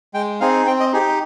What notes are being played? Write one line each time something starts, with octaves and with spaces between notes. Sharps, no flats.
G#3 G5
C4 D#4 G#4 F5
C4 G5
D#5
D#4 G4 G#4